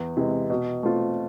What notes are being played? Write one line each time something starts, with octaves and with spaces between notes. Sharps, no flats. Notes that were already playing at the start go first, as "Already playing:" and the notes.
Already playing: E2
C3 E3 G#3
B2
A3 C4 F4